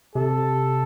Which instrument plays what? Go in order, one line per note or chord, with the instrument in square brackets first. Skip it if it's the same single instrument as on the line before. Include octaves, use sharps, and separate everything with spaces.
[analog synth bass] C3 [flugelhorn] A4